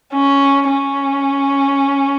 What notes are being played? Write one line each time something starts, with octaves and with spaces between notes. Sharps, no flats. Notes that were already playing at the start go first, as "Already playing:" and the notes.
C#4
C#4